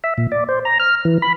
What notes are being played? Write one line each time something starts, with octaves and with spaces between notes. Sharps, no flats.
E5
A#2
D5
C5
A#5
F6
E3
B5